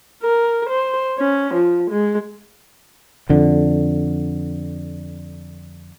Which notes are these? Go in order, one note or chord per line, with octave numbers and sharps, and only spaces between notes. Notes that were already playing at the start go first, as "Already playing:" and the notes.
A#4
C5
C#4
F3
G#3
F2 D3